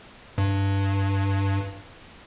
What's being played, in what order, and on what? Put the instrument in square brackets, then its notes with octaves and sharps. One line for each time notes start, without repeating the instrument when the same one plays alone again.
[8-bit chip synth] G2